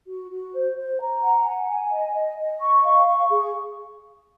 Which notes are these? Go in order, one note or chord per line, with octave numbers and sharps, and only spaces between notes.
F#4
F#4
C5
C5
A#5
F#5
G#5
G#5
D#5
D#5
D#5
C#6
F5
C#6
G#4